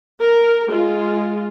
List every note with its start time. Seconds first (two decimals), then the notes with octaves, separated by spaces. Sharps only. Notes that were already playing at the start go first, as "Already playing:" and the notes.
0.17 A#4
0.68 G#3 F4